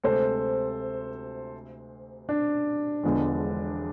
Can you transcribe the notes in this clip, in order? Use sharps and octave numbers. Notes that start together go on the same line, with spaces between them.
D2 C3 G#3 C4 A4 C5
D4
E1 E2 D3 F3 G#3